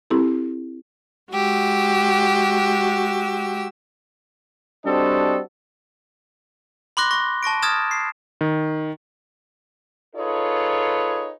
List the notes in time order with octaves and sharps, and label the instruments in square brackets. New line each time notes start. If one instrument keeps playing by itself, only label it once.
[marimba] C4 E4 G4 A4
[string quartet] G#3 F#4 G4 E6
[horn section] G3 C4 D4 F#4 A4 D#5
[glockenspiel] B5 C6 D6 F#6 A#6 G7
C#6 A#6
A5 C#6 A#6 D7
D#6 F6 G#6 A6 E7
C7
[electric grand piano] D#3
[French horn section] D#4 F4 G#4 A4 B4 C#5